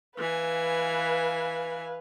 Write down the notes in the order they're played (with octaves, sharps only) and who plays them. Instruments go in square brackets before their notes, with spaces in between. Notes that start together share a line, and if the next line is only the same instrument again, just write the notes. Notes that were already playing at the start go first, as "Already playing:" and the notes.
[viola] E3 G#5 [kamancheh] B4 F5